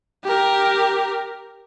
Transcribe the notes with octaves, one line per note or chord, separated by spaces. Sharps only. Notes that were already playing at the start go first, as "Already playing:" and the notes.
G4 A#4